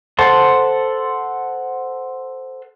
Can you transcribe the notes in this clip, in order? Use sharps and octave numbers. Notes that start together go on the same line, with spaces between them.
A4 C5 F#5 A5 C6